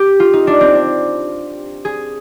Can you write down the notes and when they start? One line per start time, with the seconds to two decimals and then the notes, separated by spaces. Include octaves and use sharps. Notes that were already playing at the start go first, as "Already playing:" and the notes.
Already playing: G4
0.20 F4
0.33 D#4
0.47 D4
0.61 C4
0.75 D4
1.85 G#4